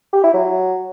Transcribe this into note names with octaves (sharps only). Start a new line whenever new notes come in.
G4
E4
F#3